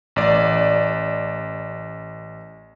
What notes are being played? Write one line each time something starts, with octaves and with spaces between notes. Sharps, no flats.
A1 D5